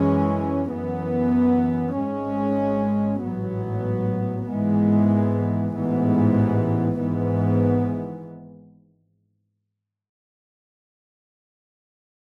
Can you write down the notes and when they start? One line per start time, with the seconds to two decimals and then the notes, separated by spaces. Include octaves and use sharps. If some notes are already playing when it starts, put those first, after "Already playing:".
Already playing: F#2 E3 G#3 C#4
0.71 F#2 E3 B3
1.97 G#1 G#2 G#3 C#4
3.23 A1 G#2 F#3 B3
4.49 G#1 G#2 E3 G#3 B3
5.75 A1 G#2 E3 B3
7.01 G#1 G#2 E3 B3